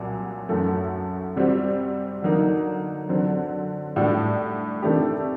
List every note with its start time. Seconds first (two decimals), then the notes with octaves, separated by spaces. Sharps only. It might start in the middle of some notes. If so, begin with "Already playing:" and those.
Already playing: C2 A#2 F#3 F#4
0.49 F#2 F#3 A3
1.36 C3 G3 C4 F#4
2.22 D3 F#3 A#3 D#4
3.09 D3 F#3 C4
3.96 A2 G3 D4 F#4
4.82 C3 D#3 A3 D4 G4